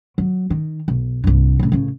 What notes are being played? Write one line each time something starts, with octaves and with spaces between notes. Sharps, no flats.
F#3
D#3
B1
C2 G2
A2 C#3
A1 C#3